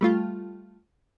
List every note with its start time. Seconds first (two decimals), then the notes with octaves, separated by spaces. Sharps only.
0.01 G3 A3 F4